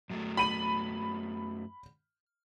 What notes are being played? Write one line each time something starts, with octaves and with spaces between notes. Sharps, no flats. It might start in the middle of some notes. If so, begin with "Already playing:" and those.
F#2 F#3 A3
B5 D#7 F#7